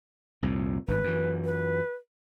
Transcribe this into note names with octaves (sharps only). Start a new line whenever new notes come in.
C2 F2 A#2
G#1 G2 B4
F#2 E3
B4